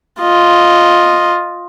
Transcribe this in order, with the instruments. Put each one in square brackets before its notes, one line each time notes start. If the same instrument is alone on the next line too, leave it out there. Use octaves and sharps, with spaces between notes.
[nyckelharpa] F4 D#5